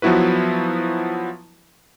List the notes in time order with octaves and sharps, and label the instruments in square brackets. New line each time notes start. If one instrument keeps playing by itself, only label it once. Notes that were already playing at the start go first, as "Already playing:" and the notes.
[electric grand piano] F3 F#3 B3 E4 F#4 B4